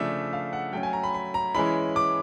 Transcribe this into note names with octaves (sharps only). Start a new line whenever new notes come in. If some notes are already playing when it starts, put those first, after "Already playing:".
Already playing: C#3 F3 A3 D4 E5
F5
F#5
F#3 A3 C#4 G5
G#5
A#5
B5
B5
A#5
E3 G#3 C#4 E4 B5
D6